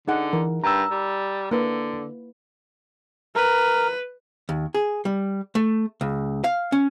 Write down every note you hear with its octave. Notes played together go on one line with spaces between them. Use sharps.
D3 D#4 G#4 F#5
E3 A#4
G2 A#5 E6
G3
D3 A#3 E4 B4
A#4 B4
D#2
G#4
G3
A3
C#2
F5
C#4